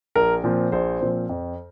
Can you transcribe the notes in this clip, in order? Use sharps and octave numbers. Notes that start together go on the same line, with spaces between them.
A#1 A#4
A#2 F3 C4
A#1 C5
A#2 F3 C4
F2